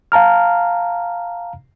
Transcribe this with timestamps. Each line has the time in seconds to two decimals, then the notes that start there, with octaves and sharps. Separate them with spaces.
0.12 F5 A5 A#5 F6